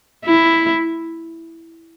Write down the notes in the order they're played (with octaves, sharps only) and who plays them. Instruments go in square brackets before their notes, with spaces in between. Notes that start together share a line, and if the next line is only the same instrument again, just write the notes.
[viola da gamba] E4